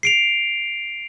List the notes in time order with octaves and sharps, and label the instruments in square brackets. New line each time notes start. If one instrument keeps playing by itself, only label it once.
[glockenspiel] C7 D7 F7